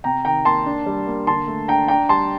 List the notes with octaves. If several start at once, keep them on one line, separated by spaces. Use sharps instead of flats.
C3 G5 A#5
D#3 G5 A#5
A#3 A5 C6
D4
G3
A#3
D3 A5 C6
A3
D4 G5 A#5
D4 G5 A#5
G3 A5 C6